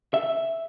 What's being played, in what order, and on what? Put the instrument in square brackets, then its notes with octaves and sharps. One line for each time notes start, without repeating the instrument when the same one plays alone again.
[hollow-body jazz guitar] E5